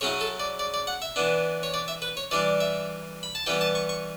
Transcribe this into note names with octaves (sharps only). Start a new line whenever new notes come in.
C#3 F#3 C#4 E4 C#5
A4
D5
D5
D5
F#5
E5
E3 B3 D4
C#5
D5
E5
B4
C#5
E3 G3 D4 D5
E5
B5
A5
E3 G3 B3 G5
A5
C#6
C#6